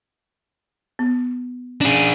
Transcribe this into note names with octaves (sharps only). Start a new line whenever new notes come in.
B3
C#4 D4 G#4